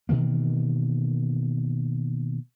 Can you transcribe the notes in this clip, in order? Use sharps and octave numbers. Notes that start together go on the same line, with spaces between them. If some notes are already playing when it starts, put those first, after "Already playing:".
B2 D#3 E3 A#3